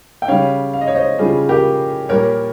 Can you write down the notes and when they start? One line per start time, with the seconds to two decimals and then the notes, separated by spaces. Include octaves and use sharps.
0.22 G5
0.28 C#3 G3 C#5 F5
0.73 F5
0.81 D#5
0.87 C#5
0.95 C5 D#5
1.19 C#3 G3 F4 G#4
1.49 G4 A#4
2.09 A#2 G3 A#4 C#5